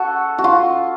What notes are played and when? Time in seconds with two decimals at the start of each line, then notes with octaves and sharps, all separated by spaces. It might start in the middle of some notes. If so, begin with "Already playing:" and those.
Already playing: F#4 A4
0.38 F#4
0.44 F4